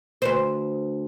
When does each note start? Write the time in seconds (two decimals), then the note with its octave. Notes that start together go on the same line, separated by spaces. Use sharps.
0.22 D2 B4 C5